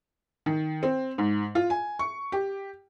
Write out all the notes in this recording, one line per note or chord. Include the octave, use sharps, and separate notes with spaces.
D#3
C4
G#2
F4
G#5
C#6
G4